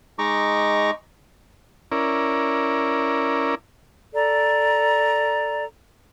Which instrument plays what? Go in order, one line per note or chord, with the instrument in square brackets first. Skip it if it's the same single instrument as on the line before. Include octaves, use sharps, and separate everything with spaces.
[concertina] G#3 D#4 A#5 C#6 D6
[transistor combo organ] C#4 E4 A#4 D5
[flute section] A4 D5 A#5